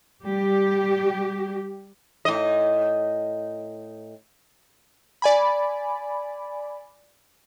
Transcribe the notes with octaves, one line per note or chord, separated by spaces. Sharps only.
G3 G4
A2 D#5
D5 G#5 B5